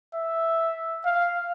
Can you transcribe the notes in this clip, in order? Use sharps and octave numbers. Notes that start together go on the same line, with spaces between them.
E5
F5